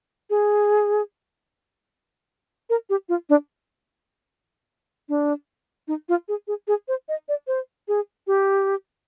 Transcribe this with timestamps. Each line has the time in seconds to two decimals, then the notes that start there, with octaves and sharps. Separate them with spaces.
0.30 G#4
2.70 A#4
2.90 G4
3.09 F4
3.29 D4
5.09 D4
5.88 D#4
6.09 F4
6.28 G#4
6.47 G#4
6.67 G#4
6.88 C5
7.09 D#5
7.28 D5
7.47 C5
7.88 G#4
8.27 G4